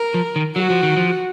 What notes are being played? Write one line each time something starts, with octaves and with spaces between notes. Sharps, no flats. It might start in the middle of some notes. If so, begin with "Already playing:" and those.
Already playing: A#4
F3
D#3
F#3 F#4
F3
D#3
F3